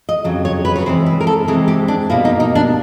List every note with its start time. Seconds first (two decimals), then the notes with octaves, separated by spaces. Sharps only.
0.09 D#5
0.24 F2 C#3 F#3
0.45 C#5
0.65 B4
0.76 C#5
0.86 C3 E3 G#3 C4 C5
1.06 B4
1.21 A#4
1.27 A4
1.48 C3 E3 G#3 C4 G#4
1.68 G4
1.88 D4
2.10 B2 G3 A#3 E4
2.25 D#4
2.40 D#4
2.55 D4